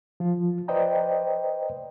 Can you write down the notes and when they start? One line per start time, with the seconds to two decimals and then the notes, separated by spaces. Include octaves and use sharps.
0.20 F3 F4
0.68 B4 C5 D5 D#5 G5 A#5